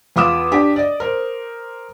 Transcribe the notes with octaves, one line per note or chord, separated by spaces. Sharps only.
E2 F4 B5 D6 D#6 E7
D4 G4
D5 D#5
A#4 C5